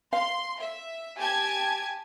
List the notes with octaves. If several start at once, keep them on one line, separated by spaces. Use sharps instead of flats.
F5 C6
E5
G4 G#5 A5 G#6